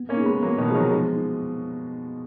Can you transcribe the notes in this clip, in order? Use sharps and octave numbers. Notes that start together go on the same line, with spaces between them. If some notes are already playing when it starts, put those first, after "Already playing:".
Already playing: B3
A#3 C#4
D#4 G#4
G#3 B3
F#3 A#3 B3
B2 D#3
F3 D#4 G#4
D#3 F#3
F3 G#3 B3
D#4